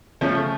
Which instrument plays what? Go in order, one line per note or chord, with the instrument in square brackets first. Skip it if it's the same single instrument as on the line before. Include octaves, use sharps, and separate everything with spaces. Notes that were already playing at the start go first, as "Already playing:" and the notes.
[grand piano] C#3 F3 A3 C#4